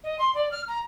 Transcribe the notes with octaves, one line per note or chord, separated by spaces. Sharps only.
D#5
C6
D5
F6
A#5